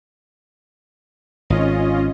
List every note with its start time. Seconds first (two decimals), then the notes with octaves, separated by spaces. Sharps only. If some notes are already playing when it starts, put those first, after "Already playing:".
1.50 G#1 C#4 F4 D#5